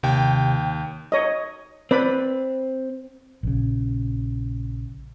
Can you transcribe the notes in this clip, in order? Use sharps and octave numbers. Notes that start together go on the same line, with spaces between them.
D#2 C3 G5
C#5 D#5
C4 B4 D5 B5
A#1 C#3